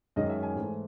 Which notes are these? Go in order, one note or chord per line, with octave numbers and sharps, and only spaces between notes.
F#2 D#3 G#3 D#5
E5
G#5
G#2 E3 A3